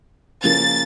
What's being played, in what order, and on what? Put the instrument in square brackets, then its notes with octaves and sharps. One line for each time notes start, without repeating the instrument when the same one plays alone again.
[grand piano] C#3 F3 A#3 [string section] A6